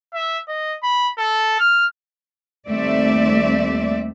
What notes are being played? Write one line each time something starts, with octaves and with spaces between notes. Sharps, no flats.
E5
D#5
B5
A4
F6
D#2 G3 A3 C4 D5 E5